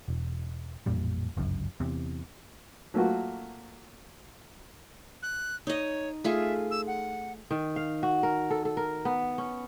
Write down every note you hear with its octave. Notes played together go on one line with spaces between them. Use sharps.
E1
A1 F2 A#2 G3
G1 C#2 F#2
E2 C3
F#3 A3 A#3 F4 F#4
F#6
D#4 C#5 D#5
A3 F4 G#4 E5
E6
F#5
D#3
F5
F#4
A#4
A4
A4
A#4
B3
C#4